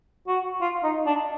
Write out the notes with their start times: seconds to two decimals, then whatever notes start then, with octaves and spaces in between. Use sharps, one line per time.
0.28 F#4
0.61 F4
0.84 D#4
1.06 D4